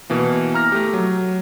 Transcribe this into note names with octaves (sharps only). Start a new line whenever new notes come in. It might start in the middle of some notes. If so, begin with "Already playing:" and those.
B2 E3 A#3
A#5 F6 A#6
A3 G4
F#3